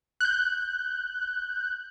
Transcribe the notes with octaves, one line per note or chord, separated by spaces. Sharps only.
F#6 G6